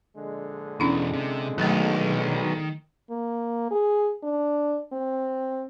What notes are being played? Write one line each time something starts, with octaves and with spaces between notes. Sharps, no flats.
A#1 D3 G#3
E2 B2 C#4 D4 E4
C3
B1 D#3 F#3 A3
A#3
G#4
D4
C4